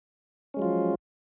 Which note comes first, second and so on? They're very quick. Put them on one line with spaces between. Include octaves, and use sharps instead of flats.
C#4 G#3 F#3 F4 F3